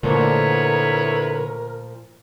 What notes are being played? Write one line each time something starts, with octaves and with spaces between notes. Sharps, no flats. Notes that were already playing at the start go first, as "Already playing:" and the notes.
A#2 D3 F3 A3 E4 A#4 B4 C#5